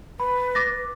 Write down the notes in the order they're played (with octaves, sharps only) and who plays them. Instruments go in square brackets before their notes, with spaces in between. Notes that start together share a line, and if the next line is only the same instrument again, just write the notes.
[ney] B4 [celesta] B5
[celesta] D6 A6 A#6